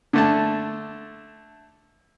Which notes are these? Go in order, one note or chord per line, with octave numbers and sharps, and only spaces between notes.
D3 A3 A5